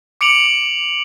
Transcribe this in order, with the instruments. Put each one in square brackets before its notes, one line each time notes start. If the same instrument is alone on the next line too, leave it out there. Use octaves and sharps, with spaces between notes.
[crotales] D6 C#7 D7 F7 F#7